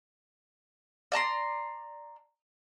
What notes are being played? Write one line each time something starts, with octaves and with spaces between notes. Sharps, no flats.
D5 A5 A#5 C6